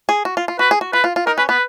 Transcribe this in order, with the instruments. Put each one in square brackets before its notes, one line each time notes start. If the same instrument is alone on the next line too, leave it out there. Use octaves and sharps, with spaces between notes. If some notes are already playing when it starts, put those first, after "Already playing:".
[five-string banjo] G#4
F#4
F4
F4
[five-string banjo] F#4 [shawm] B4
[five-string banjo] G#4
F#4
[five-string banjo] F4 [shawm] B4
[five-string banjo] F4
F4
[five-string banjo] D#4 [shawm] A#4
[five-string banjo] C#4 [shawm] B4
[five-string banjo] B3 [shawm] B4